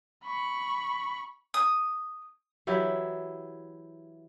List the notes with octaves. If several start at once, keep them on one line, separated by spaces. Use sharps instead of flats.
B5 C#6
D#6
E3 F#3 E4 G4